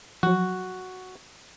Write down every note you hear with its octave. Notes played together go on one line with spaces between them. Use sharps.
F3 F#3 F#4